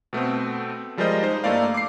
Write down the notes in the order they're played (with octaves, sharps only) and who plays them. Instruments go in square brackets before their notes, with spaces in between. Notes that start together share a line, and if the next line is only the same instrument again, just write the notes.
[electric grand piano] B2 A3 B3 C4
F3 G3 G#3 A#4 C5 D#5
D#4 C5
G2 A3 A#3 E4 D5 F5
D6 C7